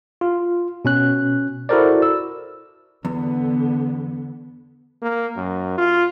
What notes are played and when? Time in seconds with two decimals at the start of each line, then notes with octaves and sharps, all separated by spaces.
0.21 F4
0.85 B2 C#4 F#6
1.69 E4 F#4 A4 A#4 C5 D5
2.02 E6
3.05 E2 D3 B3
5.02 A#3
5.36 F#2
5.78 F4